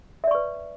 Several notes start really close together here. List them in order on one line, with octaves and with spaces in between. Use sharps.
E5 D5 C#6 B4